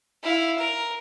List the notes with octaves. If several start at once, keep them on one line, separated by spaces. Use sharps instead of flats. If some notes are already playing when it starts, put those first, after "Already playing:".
E4 F5
A#4